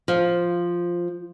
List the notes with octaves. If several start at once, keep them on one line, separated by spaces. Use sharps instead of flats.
F3